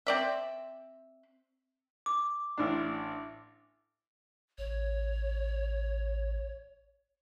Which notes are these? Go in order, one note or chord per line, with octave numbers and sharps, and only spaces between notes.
C4 D5 E5
D6
A1 D4
A1 C#5